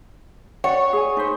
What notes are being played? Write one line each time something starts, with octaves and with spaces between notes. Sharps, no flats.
F#4 C#5 D5 F#5
G#4 G#5
D#4 B4 C5